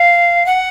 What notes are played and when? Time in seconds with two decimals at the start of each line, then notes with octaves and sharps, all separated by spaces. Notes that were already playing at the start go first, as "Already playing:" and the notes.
Already playing: F5
0.46 F#5